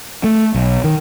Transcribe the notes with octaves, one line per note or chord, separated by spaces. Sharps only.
A3
B1
D#3